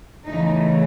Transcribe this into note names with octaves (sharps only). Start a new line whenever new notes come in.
E2 C#3 E3 A3 D#4